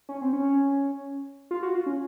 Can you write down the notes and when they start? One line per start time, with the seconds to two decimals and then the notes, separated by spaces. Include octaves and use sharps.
0.09 C#4
0.22 C4
0.33 C#4
1.51 F4
1.63 F#4
1.75 F4
1.86 C#4